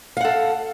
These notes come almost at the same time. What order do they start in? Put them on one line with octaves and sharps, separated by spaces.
F5 F#5 A4